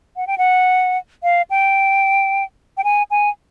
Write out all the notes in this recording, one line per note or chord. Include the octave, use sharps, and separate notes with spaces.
F#5
G5
F#5
F5
G5
G5
G#5
G#5